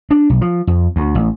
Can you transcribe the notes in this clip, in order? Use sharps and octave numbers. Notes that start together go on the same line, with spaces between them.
D4
B1
F3
F2
D2
A1